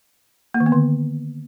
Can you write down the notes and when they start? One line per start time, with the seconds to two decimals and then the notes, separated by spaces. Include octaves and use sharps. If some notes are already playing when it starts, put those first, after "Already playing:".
0.54 A#3
0.60 D#3
0.66 B3
0.72 D3